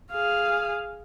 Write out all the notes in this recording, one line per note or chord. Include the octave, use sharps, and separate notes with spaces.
G#4 F5